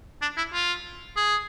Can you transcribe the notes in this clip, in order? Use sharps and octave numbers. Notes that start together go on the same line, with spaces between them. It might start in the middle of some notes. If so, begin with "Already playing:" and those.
D4
E4
F4
G#4